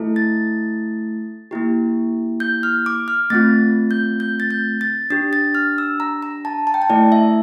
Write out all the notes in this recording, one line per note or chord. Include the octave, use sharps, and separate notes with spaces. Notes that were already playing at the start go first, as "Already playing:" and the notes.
Already playing: A3 E4 A4
A6
A#3 E4 G4
G6
F6
D6
F6
A3 C4 F4 A6
G6
G6
A6
G6
A6
D4 G4 A6
A6
F6
E6
A#5
A#5
A5
A5
G5
A5
A3 E4 A4 D5
E5